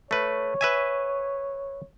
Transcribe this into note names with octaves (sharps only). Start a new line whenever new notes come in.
A3 B4 C#5
B4 E5 G#5